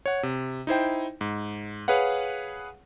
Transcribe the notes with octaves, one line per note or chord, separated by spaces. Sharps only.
C#5 F#5
C3
D#4 E4 C5 G5
G#2
G#4 B4 C#5 F5 F#5